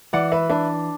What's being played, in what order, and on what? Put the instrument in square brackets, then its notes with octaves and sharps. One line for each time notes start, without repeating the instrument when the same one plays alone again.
[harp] E3 [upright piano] D5 F#5
[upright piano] B4 E5
[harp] D4 [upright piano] B4 E5